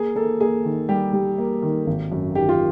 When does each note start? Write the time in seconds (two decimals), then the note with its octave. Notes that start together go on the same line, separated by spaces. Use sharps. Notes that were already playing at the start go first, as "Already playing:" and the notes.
Already playing: A#3 G#4
0.15 A#3 A4
0.40 A#3 G#4
0.65 D#3
0.89 G3 G4
1.13 G3
1.38 A#3
1.62 D#3
1.86 G#1
2.12 F#2
2.35 D#3 G4
2.49 F4